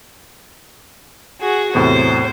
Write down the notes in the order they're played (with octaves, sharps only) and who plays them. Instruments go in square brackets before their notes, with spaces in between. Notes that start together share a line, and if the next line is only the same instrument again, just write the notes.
[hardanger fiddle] F#4 G#4
[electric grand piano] E2 A2 C3 [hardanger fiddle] C5